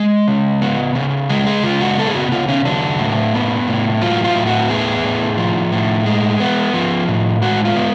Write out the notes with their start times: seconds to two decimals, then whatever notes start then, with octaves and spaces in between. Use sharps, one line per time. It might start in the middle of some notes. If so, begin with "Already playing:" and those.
Already playing: G#3
0.27 C#3
0.62 B3
0.95 C#3
1.29 G#3 G#4
1.47 G#4
1.63 C#3 F4
1.80 F#4
1.98 B3 A4
2.07 G#4
2.15 F#4
2.32 C#3 F4
2.48 C#4
2.65 F#3 D4
2.99 A2
3.34 B3
3.68 A2
4.01 F#3 F4
4.24 F4
4.36 A2
4.47 F#4
4.70 B3 G#4
5.04 A2
5.38 F3
5.72 A2
6.06 G#3
6.40 B3
6.74 F3
7.08 A2
7.42 G#3 F#4
7.65 F4
7.76 B3